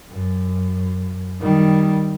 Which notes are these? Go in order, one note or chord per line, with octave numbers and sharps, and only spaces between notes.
F#2
D#3 G3